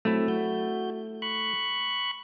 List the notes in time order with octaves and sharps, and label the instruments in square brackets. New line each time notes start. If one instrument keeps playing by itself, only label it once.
[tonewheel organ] F#3 C4 [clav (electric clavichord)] A3 E4
[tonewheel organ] F#4 G6
B5 C#6 F#6